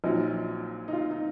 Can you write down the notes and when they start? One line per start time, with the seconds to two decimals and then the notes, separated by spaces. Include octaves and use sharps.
0.04 A#1 A#2 F#3 D#4
0.88 D#4
0.93 F4
1.11 D#4